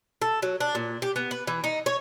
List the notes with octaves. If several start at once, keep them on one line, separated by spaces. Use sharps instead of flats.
A4
F#3
D4
A#2
G4
B3
B4
E3
D#4
C#5